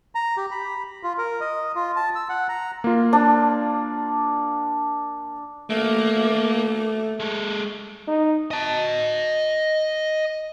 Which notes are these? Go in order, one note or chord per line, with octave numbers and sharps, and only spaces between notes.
A#5
G4
B5
F4
A#4
D#5
F4
A5
E6
F#5
A#5
A#3 F4
D4
A3 A#3
G#3 A4
D#4
D#5 A5